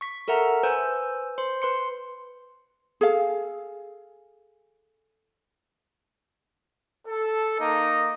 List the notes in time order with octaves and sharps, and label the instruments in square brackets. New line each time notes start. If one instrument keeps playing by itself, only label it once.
[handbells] C#6 B6
A4 A#4 E5 F#5 A#5
B4 C5 G#5 E6 G6
C5 C6
B4 C6 C#7
[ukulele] G#4 A4 F5
[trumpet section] A4
A#3 D#4 D#5